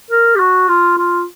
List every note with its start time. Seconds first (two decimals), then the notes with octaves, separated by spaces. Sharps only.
0.11 A#4
0.35 G4
0.40 F#4
0.69 F4
0.98 F4